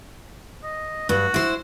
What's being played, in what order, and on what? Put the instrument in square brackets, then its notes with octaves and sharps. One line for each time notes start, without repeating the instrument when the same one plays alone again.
[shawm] D#5
[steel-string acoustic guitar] G2 [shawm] F#4
[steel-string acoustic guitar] E4 C5